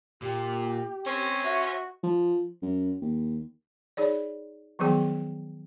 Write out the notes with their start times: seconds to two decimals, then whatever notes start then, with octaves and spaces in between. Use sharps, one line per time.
0.22 A#2 G4
1.06 C4 C#4 C5
1.45 F#4 E5
2.03 F3
2.62 F#2
3.01 D#2
3.97 D#4 G#4 C#5 D5
4.79 D#3 F3 F#3 B3 G#4 G5